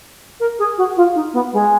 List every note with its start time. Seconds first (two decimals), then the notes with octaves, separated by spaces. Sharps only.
0.40 A#4
0.59 G#4
0.78 F#4
0.97 F4
1.15 D#4
1.33 B3
1.53 G#3